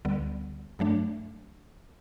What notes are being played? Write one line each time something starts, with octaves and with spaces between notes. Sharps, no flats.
D2 D3 G3 B3
G2 F#3 A3 D4